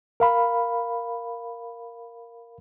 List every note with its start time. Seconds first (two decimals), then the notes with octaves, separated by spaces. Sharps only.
0.20 A#4 F5 B5